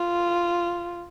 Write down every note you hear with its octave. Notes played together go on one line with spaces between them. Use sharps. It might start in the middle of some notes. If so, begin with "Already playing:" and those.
Already playing: F4